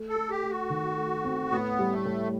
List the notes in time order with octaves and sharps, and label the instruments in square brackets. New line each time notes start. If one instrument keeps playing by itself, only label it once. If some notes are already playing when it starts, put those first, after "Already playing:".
Already playing: [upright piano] A3
[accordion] A4
[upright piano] A3
[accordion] G4
[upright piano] A3
[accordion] F#4
[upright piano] D#3
A3
C4
[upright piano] A2 [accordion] B3
[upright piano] G3
[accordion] A3
[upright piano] A2